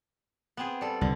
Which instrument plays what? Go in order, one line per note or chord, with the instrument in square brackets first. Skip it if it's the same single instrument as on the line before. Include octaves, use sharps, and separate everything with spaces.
[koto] B3 C4 G#4
G3 A4
[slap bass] C2 [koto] D3